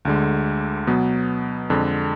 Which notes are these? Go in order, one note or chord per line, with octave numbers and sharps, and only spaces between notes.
D2 D3 G#3
B2 F#3 B3
F2 D3 G#3